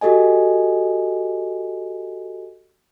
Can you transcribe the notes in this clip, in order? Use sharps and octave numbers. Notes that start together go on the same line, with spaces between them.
F#4 G4 A4 D#5 G#5